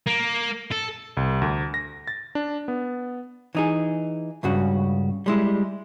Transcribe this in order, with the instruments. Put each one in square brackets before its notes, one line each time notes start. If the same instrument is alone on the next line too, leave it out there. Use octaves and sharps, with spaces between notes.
[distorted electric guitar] A#3
A4
[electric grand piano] C2
D2
A#6
A6
D4
B3
[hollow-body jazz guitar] E3 D#4 G#4
C#2 G2 C#3 F#4
G3 G#3 E4